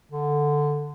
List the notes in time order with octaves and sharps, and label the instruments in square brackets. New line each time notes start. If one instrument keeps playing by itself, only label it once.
[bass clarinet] D3